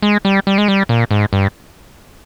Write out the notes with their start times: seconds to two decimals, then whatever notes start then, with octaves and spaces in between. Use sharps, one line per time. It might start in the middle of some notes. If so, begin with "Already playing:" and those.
0.03 G#3
0.25 G3
0.47 G3
0.58 G#3
0.68 G3
0.89 A#2
1.11 G#2
1.33 G2